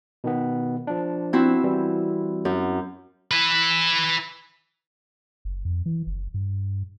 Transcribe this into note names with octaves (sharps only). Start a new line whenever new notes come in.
B2 D#3 B3
F3 D4
C4 E4 F#4
E3 G3
F#2
E4 B4
F#1
F2
E3
F#1
G2